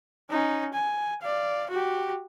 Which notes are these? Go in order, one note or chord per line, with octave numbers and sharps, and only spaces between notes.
C#4 D#4
G#5
D5 F5
F#4 G4